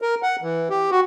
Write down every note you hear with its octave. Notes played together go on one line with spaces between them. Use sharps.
A#4
F#5
E3
G4
F#4